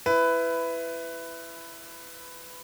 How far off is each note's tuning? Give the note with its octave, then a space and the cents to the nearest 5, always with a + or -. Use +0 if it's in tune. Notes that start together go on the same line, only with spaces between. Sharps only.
E4 +10 B4 +15